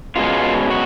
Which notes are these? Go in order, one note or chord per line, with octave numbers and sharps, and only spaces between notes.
B2 G#3 C#4 F4
F#4